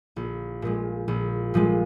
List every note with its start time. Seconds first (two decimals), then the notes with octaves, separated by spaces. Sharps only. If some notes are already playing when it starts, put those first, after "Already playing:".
0.16 A#1
0.62 A#2 F3 G#3
1.08 A#1
1.54 A#2 F3 G#3